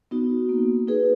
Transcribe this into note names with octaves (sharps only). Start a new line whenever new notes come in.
B3 D#4 F#4
A#3
D#4 G#4 B4